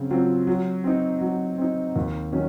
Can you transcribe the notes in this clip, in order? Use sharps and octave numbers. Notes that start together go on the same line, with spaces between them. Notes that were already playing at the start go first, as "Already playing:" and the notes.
Already playing: C#3 F#3 C4
F#3 C4 F4
F#3
C4 D#4
F#3
C4 D#4
D#2
D#3 F#3 C#4